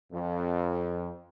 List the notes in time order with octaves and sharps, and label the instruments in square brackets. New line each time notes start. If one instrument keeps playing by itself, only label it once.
[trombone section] F2